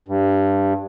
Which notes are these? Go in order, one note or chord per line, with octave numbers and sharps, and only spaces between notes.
G2